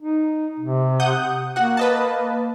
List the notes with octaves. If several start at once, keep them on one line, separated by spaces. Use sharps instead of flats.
D#4
C3
F#5 D#6 G6
A#3 F#4 F#5
B4 D#5 A5